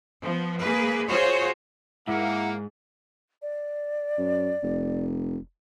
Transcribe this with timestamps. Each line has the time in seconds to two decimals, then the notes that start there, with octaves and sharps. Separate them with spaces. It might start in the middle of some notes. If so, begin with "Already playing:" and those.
0.21 F3 B3
0.60 A#3 G#4 B4
1.08 F4 F#4 G#4 C5 C#5
2.08 G#2 A#3 E4 F#5
3.42 D5
4.18 F#2
4.63 F1